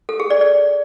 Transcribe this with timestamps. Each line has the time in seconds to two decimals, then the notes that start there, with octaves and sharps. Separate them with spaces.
0.09 A4
0.20 G#4
0.30 D5
0.41 D5